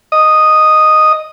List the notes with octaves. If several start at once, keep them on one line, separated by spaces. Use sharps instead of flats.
D#5 D#6